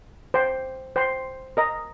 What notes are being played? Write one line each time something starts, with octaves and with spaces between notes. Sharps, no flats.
C5 G5 C6
C5 G5 C6
A#4 D#5 A#5